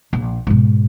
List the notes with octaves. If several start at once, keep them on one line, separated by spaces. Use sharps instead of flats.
A#1
G#2 B2